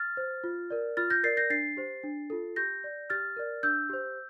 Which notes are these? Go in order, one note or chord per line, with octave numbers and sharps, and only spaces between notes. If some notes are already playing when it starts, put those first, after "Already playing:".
Already playing: F6 A6
C5
F4
A#4 D5
F4 F6 A6
G6 A#6
A#4 D5 A6 C7
G6 A#6
D4 A6 C7
G4 C5
D4
F4 A4
G4 G6 A#6
D5
G4 F6 A6
A#4 D5
D4 E6 G6
G4 C5